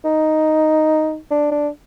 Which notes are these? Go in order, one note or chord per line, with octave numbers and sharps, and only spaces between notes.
D#4
D4
D4